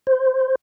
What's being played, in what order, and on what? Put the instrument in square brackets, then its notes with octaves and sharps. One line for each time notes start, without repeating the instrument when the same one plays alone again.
[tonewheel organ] C5